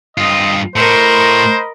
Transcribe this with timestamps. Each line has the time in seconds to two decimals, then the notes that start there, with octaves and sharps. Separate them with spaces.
0.18 G2 C4 F4 D#5
0.76 A2 A#4 C5 D#5 B5 C6